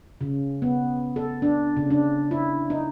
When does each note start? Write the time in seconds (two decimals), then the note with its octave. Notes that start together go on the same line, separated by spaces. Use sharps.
0.21 C#3
0.62 B3
1.16 A4
1.42 D4
1.77 C#3
1.90 D4
2.31 E4
2.70 D#4